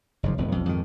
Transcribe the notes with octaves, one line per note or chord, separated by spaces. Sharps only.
F#1 G#2 C3 F3
E1 F2 A2
B1 F2 F3
F2 G#2 D#3